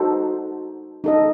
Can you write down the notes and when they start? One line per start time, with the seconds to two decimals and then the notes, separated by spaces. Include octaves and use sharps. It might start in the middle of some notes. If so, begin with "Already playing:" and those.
Already playing: D#4 F#4 A4 C5
1.04 D#4 A4 D#5